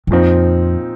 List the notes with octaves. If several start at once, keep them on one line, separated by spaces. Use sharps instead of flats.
G2
F2 A#2 F3 C4 D#4